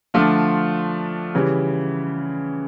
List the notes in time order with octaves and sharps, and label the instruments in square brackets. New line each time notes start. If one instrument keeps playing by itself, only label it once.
[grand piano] D3 F3 A3 D4 F4
C#3 E3 G3